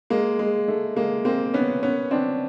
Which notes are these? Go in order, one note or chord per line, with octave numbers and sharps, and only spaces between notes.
G#3 A#3
G#3
A3
G#3 A#3
A#3 C4
B3 C#4
B3 C#4
C4 D4